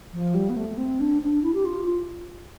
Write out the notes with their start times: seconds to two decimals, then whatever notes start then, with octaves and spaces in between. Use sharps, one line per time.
0.13 F3
0.34 G3
0.49 B3
0.57 A3
0.77 C4
1.00 D4
1.22 D4
1.43 E4
1.54 G4
1.65 F4